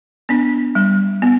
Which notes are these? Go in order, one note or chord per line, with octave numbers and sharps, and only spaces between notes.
B3 D4
G3
B3